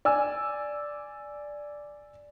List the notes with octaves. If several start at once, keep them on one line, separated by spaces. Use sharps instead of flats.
D5 G#5 E6